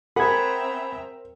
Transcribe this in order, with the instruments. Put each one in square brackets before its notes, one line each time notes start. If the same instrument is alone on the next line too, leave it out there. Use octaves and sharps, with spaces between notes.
[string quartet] C4 E5 A#5 [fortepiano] G#4 F#5 [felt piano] A#4 [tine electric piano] B5 G#6